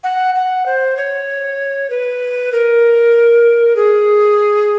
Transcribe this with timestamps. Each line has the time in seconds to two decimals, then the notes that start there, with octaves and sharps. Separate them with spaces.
0.03 F#5
0.34 F#5
0.65 C5
0.97 C#5
1.90 B4
2.52 A#4
3.76 G#4